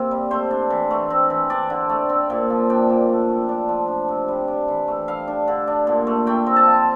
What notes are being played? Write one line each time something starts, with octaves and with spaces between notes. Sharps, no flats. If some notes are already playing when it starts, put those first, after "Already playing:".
Already playing: C3 A#3 C4
G3
A3 C5
D4
E3
A3
C4
E3
D4 D5
D3
A3
C4
A#2
F3
D4 G5
A#2
A3
A3
D4
F3
D4
C3
G3
D4
E3
A3
G3 F5
D4
D3
D4
A#2
A3
A3 G5
C4
A5
F3